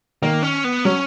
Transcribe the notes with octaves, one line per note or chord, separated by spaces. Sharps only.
D#3 A#3
C#4
B3
F#3 C#4